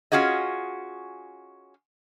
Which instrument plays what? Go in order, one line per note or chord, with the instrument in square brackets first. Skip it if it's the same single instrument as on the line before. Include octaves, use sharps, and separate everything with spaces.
[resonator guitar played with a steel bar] C#4 F4 F#4 G#4 D#5